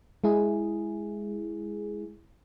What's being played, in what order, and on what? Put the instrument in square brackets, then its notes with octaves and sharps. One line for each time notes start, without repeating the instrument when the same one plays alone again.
[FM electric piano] G#3 E4 G#4